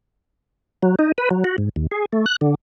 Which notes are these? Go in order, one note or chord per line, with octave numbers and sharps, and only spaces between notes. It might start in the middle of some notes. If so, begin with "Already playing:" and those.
F#3
D#4
B4
F#3
F#4
G#2
D#2
G#4
A3
F#6
D3